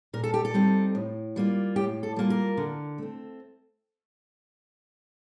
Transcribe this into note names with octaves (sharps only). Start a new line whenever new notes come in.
A#2 A#4
A4
G4
A4
G3 C4 D#4
A2
G3 A#3 F4
A2 G4
A4
G3 A#3 F4
A#4
D3
A3 C4